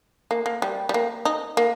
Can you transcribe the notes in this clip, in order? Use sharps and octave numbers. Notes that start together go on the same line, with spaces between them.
A#3
A#3
G3
G3
A#3
D#4
A#3